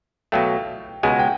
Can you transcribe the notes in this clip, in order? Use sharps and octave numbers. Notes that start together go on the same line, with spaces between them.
B2 F#3 A3 F5 G5
C#2 B2 G#3 F#5 G#5
G5